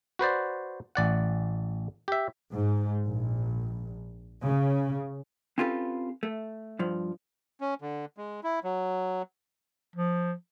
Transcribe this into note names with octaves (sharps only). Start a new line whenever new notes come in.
F#4 B4 C5 D5
A1 D5 F#5
G4 E5
G#2
A#1
C#3
C4 C#4 F4 G4 A4 B4
A3
G2 F3
C#4
D3
G#3
E4
F#3
F3